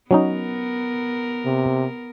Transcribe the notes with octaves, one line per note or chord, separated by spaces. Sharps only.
F#3 B3 C#4 D#4 A#4
C3